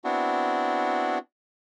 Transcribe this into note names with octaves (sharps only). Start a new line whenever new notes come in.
B3 C4 D4 E4 F#4